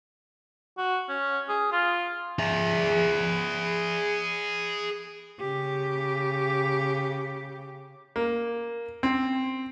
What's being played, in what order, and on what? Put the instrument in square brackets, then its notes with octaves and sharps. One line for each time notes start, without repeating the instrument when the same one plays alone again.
[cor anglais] F#4
C#4
G#4
F4
[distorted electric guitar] G#4 E5
[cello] C#3 G4
[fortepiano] A#3
C4